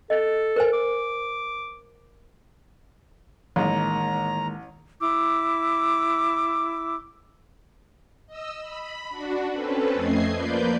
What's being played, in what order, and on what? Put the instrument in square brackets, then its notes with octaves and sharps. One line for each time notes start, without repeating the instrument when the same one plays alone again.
[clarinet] A4 [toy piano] D#5
[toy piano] A#4 C5 G#5
[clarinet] D6
[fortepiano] A1 [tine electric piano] D#3 G#3 A#3 [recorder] A#5
[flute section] E4 D6 E6
[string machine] D#5 E6
B5
D4 F#4
C4 C#4 A4 B4
F2 A3 D#5 G#6 C7
F3 A#3 B4 D5 G6